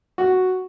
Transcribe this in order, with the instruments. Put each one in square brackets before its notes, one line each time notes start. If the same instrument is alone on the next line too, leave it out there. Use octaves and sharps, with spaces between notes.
[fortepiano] F#4